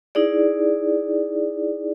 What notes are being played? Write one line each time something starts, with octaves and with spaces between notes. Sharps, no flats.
D#4 E4 G#4 D5